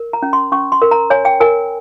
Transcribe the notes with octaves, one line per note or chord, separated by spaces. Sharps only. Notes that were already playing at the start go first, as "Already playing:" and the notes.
Already playing: A#4
A#5
C#4
C6
C#4 C#6
C6
A#4
A#5
C#5 G#5
G5
A#4 G#5